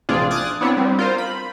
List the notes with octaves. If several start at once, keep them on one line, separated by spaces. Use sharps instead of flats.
A#1 C3 D4 F4 G#4 D5
D6 D#6 F6 F#6 G#6 A6
B3 C4 D4 E4 C#5
G3 C4
F4 A#4 C5
B5